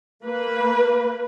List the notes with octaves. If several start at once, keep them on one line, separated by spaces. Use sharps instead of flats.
A#3 B4